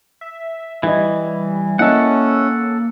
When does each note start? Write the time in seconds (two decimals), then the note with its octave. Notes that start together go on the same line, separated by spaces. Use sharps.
0.21 E5
0.83 E3 G3 E4 D#5
1.79 A#3 C#4 E4 A4 D#5 F#5